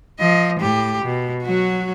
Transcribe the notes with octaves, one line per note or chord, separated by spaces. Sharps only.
F3 D#5
A2 G4
B2
F#3 F#4